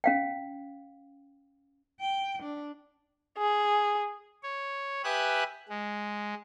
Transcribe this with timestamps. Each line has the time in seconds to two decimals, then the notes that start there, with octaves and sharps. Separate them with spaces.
0.04 C#4 F5 G5
2.00 G5
2.43 D4
3.38 G#4
4.43 C#5
5.04 G4 B4 E5 G#5 D#6 F#6
5.69 G#3